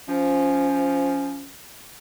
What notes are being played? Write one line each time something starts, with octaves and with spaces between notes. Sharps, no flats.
F3 C#4